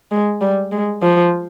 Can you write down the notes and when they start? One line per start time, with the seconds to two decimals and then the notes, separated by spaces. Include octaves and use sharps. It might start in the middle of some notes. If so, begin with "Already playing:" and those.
0.11 G#3
0.41 G3
0.72 G#3
1.03 F3